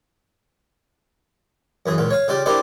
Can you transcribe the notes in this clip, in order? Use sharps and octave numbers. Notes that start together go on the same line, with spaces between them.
F#2 E3 G#4
C#2 A#2 F4
C#5 F5
C#3 F4 G4 D5 G5
A#3 D4 E4 G4 C5 D5